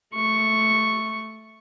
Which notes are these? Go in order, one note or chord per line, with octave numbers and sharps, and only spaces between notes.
A3 C#6